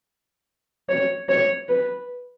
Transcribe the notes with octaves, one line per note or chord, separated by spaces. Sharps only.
C#5
C#5
B4